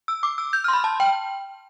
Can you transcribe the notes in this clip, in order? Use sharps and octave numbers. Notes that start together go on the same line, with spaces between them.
E6
D6
E6
G6
C6 F6
B5
A5
G5